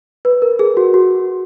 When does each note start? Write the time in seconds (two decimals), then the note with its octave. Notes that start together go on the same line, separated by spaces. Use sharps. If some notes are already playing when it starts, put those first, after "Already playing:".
0.25 B4
0.42 A#4
0.59 G#4
0.77 F#4
0.94 F#4